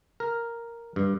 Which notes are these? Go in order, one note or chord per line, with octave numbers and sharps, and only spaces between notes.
A#4
G2